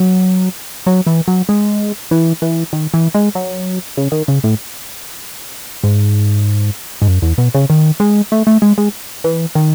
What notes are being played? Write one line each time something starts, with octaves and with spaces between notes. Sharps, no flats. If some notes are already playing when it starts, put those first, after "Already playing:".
Already playing: F#3
F#3
E3
F#3
G#3
E3
E3
D#3
E3
G#3
F#3
C#3
D#3
C#3
A2
G#2
G#2
F#2
E2
B2
C#3
D#3
G#3
A3
A3
G#3
G#3
E3
D#3